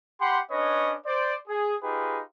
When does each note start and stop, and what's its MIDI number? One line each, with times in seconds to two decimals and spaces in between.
0.20 0.39 67
0.20 0.39 78
0.20 0.39 83
0.20 0.39 84
0.51 0.95 61
0.51 0.95 62
0.51 0.95 71
0.51 0.95 73
0.51 0.95 75
1.06 1.36 72
1.06 1.36 74
1.48 1.75 68
1.83 2.21 63
1.83 2.21 65
1.83 2.21 67
1.83 2.21 68
1.83 2.21 71